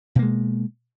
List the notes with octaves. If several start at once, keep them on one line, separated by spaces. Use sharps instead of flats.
B2 G#3 A#3